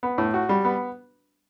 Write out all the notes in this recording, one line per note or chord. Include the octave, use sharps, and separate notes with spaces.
B3
A2
F#4
G3
B3